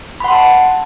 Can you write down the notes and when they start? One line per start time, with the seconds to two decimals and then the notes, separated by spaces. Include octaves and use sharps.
0.20 B5
0.24 F#5
0.28 C6
0.32 A5